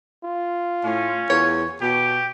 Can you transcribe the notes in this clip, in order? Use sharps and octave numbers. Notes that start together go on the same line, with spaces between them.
F4
A2 C#4
E2 C#5
B2 G4